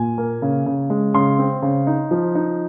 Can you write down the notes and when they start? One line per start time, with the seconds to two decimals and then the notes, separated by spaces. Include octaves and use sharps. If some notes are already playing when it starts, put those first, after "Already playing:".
Already playing: A#2 G#5
0.18 A#3
0.42 C#3
0.66 C#3
0.90 G#3
1.14 C#3 C6
1.39 C4
1.62 C#3
1.87 D#4
2.11 F3
2.35 D#4